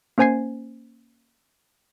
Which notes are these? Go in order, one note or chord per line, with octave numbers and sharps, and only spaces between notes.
A#3 C#4 C5 G#5 G#6 C7